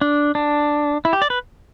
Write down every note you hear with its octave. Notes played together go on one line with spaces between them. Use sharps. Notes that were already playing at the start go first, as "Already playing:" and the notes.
D4
D4
E4
G4
D5
B4